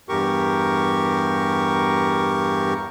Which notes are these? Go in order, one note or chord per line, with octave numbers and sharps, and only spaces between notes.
E2 G2 G4 A#4 C#6